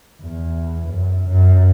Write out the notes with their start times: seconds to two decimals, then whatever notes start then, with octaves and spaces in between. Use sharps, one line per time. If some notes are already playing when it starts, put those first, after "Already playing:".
0.22 E2
0.87 F#2
1.29 F#2